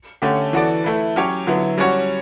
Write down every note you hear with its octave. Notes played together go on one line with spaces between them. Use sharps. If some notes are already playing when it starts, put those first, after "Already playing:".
D3 A3 C#4 G4
E3 B3 F#4 A4 D5
A3 E4 B4
F#3 C#4 G4 C#5
D3 F#3 B3 E4
G3 C#4 F#4 C#5